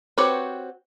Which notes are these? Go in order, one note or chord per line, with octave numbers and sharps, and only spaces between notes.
C4 F#4 G4 B4 C#5